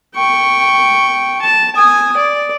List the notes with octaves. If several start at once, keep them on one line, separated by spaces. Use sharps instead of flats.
G5 C#6
A5
G#5 D#6
D5